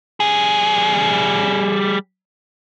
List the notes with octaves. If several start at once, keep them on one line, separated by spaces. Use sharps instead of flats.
G3 G#4